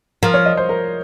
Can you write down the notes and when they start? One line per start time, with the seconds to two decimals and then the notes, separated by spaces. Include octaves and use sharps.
0.23 F3 A#4
0.34 C#5
0.46 D#5
0.57 C5
0.69 A#4